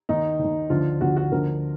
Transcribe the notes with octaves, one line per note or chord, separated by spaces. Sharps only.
D#2 D#3 D#4
D#2 D#3
D2 D3 F3 F4
D2 D3 F3 F#4
F#4
D2 D3 F3 A#4